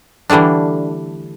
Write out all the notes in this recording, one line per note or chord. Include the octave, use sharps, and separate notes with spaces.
D3 E3 G3 A3 D4